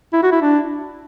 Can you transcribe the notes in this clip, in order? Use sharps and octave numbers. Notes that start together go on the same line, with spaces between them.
E4
F#4
E4
D4